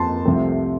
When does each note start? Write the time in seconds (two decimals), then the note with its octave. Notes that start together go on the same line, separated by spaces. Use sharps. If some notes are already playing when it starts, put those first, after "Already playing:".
Already playing: F2 F3 C4 A5 C6
0.25 C2 C3 F3 A3 C4